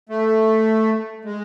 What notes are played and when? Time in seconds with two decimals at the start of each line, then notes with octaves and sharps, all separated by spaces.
0.09 A3
1.25 G#3